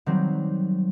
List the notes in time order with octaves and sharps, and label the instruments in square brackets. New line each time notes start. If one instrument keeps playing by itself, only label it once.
[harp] D#3 F#3 G3 C4